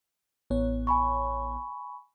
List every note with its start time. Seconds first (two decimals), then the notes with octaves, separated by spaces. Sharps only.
0.50 A1 B3 C#5
0.87 G#5 B5 C#6